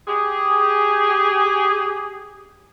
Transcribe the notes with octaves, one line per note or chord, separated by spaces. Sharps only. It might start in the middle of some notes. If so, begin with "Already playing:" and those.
G4 G#4